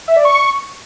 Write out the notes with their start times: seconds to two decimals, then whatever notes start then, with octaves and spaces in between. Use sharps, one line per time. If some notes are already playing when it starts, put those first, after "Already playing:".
0.08 E5
0.16 D5
0.25 C#6